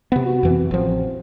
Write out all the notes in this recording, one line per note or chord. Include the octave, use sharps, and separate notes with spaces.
C3 B3
F#4
F2 E3 C4
A1 F3 C4